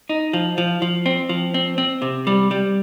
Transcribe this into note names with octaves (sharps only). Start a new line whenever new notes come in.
D#4
F3
F3
F3
C4
F3
C4
C4
C3
G3
G3